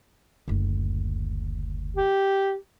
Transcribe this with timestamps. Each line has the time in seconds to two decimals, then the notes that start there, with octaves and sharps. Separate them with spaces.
0.48 F#1 D2
1.96 G4